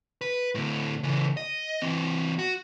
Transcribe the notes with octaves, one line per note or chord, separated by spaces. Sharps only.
B4
D2 A2
C#3 E3
D#5
E3 C4
F#4